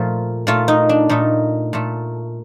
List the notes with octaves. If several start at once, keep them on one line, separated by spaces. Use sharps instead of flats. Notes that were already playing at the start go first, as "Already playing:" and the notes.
Already playing: A#2 F3 A3
A#2 A3 F4
D#4
D4
A#2 A3 D#4
A#2 A3